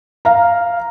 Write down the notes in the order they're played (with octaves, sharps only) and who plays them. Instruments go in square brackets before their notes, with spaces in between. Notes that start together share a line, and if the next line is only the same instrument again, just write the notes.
[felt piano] F5 A#5